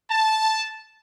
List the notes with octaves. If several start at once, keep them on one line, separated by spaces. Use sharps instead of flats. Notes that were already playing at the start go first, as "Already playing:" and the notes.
A5